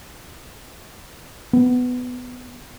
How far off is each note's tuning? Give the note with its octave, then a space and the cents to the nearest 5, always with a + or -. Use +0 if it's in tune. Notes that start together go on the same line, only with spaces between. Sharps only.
B3 +15